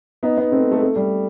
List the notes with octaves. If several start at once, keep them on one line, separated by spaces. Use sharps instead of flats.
B3 D#4
B3 D#4
A3 C4
A3
A3
G3